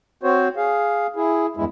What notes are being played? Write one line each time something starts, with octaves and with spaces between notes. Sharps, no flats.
C4 F#4 C5 C#5
G#4 F5
E4 G#4
E2 G2 G#3 E4